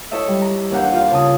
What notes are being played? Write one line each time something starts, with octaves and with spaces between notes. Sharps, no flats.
E4 A4 C#5 D#5 E5
G3
A#5
D#2 E3 D4 F5 F#5 G6
F4 F5
C#3 A5 D#6